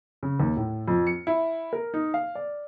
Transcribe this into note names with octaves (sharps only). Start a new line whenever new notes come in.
C#3
D#2
A2
F2
C#7
E4
A#4
D#4
F5
D5